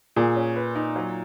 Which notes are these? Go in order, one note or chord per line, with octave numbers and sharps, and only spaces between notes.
A#2 G#4
C#4
B4
D#4
F#3